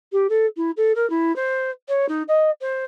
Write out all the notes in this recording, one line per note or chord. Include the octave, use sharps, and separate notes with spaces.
G4
A4
E4
A4
A#4
E4
C5
C#5
D#4
D#5
C5